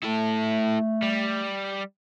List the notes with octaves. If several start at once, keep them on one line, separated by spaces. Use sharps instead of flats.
A3 E4 A4
G3